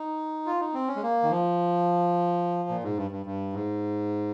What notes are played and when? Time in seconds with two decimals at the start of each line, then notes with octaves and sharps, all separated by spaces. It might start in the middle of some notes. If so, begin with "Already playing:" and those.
Already playing: D#4
0.46 F4
0.60 D#4
0.74 C4
0.88 C#4
0.96 G#3
1.02 A#3
1.23 D#3
1.30 F3
2.69 A#2
2.83 G#2
2.97 G2
3.11 G2
3.26 G2
3.53 G#2